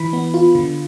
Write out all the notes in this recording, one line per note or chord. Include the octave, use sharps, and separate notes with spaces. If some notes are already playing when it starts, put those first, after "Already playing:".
Already playing: E3 B5
B3
F4
D3